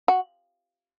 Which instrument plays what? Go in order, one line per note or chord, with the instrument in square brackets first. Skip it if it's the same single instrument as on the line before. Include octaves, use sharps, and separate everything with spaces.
[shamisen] F#4